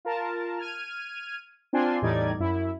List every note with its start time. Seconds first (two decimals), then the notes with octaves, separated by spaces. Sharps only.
0.05 F4 A#4 A5
0.59 F6 G#6 D#7
1.73 C4 D4 F4 G#5 C6
2.02 E2 A2 G3 D#4 D5 G#6
2.39 F#2 E4